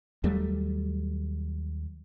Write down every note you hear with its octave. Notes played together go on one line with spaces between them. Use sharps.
D#2 F#3 G3 A3